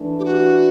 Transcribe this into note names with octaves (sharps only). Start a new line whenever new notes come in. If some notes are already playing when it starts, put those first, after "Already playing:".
Already playing: E3 A3 D4
G4
F#4